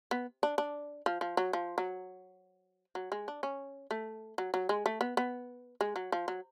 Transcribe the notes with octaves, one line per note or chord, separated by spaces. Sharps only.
B3
D4
D4
F3
F3
F#3
F3
F#3
F#3
G#3
D4
C#4
A3
F#3
F#3
G#3
A3
B3
B3
G#3
F#3
F3
F#3